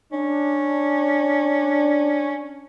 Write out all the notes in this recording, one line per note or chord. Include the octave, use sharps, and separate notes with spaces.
C#4 D4